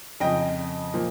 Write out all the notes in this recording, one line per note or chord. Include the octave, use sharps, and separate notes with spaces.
F2 C#3 F3 D#5 G5
A#2 F3